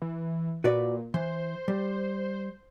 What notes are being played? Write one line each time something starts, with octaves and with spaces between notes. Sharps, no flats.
E3
A#2 F#4 B4 D5
E3 C5
G3